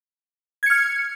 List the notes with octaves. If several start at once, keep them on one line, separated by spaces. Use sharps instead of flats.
F6 G#6 C#7